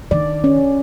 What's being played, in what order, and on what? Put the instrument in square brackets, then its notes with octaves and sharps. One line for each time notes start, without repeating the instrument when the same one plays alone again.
[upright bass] D#3 [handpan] D5
[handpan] C#4